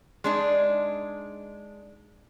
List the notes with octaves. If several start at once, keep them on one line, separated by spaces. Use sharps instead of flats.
G#3 D4 D#4